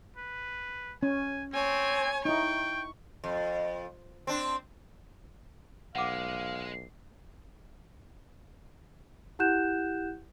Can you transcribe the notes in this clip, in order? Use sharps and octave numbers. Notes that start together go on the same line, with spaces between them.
B4
C#4 G#5
C4 C#5 G#5
D#4 E4 G5 C#6
F2
C4 D4
B1 G#3 F5 F#5 D6
E4 G4 F#5 F#6 G6 E7